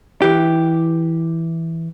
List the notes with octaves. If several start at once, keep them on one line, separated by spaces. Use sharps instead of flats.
E3 G4